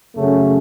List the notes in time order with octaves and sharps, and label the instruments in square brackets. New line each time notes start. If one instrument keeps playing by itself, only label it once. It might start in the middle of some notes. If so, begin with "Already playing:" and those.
[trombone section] F#2 C#3 F#3 A3 C#4